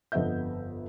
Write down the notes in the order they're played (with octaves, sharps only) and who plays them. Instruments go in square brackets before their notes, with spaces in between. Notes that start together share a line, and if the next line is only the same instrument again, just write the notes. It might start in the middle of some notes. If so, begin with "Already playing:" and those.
[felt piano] G1 F2 B3 D#5 E5 G6